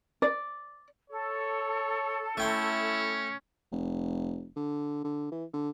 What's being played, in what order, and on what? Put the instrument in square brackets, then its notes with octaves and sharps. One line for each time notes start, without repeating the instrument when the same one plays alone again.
[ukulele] D5
[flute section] A4 [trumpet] C#5
[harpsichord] A3 G5 C6 [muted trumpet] C#4 [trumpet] E4
[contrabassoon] F1
D3
D3
E3
D3